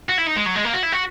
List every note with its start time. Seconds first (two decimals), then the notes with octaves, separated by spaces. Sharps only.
0.09 F#4
0.18 E4
0.26 D#4
0.36 G#3
0.46 F#3
0.56 G#3
0.65 A#3
0.74 F#4
0.83 E4
0.92 F#4